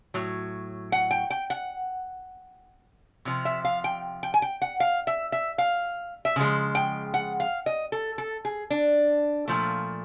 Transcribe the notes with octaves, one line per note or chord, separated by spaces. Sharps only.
A2 F#3
F#5
G5
G5
F#5
C3 F3
E5
F5
G5
G5
G#5
G5
F#5
F5
E5
E5
F5
E5
C#3 F3 G#3
G5
F#5
F5
D#5
A4
A4
G#4
D4
A#2 F3 A3